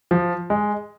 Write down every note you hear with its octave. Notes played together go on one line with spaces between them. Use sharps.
F3
G#3